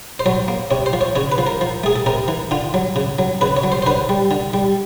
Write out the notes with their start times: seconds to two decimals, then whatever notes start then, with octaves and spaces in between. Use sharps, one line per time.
0.20 C5
0.26 F#3 C#5
0.48 A#3
0.71 C3 C#5
0.86 C5
0.93 F3
1.01 C#5
1.16 C#3 C#5
1.32 B4
1.38 F3
1.47 A#4
1.61 F3
1.84 A3 G#4
1.96 A4
2.06 C3 A#4
2.28 E3
2.51 D3 F4
2.74 F#3
2.96 C#3
3.19 F#3
3.41 C#3 B4
3.57 C#5
3.64 F#3
3.72 C5
3.82 C5
3.86 D3 B4
4.09 G3
4.31 D3
4.54 G3